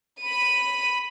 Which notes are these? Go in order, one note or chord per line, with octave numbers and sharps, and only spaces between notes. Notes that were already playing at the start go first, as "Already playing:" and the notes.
B5 D#7